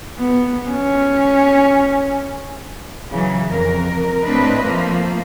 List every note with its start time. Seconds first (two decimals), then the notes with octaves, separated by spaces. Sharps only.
0.18 B3
0.70 C#4
3.11 C#3 E3 F#3
3.47 F2 A#4
4.25 A2 C4 D4 B4 D#5
4.62 F3 A3 A#3